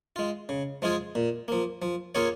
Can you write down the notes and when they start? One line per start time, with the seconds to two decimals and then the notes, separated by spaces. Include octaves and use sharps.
0.16 G#3 F4
0.49 C#3
0.82 F3 G#3 F4 G#4
1.15 A#2
1.48 F3 A#3
1.82 F3
2.15 A#3 F4 G#4 C#5